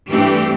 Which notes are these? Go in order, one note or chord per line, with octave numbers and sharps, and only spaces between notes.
G2 E3 A3 C4 G4